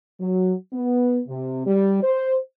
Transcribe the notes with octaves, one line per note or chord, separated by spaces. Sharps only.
F#3
B3
C3
G3
C5